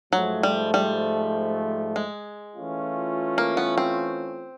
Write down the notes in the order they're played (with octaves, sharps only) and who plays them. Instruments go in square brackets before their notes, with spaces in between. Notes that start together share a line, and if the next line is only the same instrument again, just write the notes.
[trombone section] G#2 F3 A3 [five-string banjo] F#3
[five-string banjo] G3
G3
G#3
[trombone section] E3 A3 C#4 F4
[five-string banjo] A#3
B3
C4